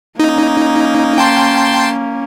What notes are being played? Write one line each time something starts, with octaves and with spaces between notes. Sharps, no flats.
A#3 C#4 D#4
G5 A5 C6